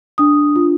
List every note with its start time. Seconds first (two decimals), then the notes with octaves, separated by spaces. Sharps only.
0.18 D4 D#6
0.56 F4